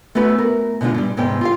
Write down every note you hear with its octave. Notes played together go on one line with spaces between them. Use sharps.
A3 B3 C#4 F#4 B4
A#4
B2 D3 G#3 D#4 F4
G2 G3
E2 G#2 C3 B3 G5
F4 G4 F5